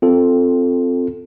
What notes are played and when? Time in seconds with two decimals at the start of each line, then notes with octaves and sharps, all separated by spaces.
0.02 C4 F4 A4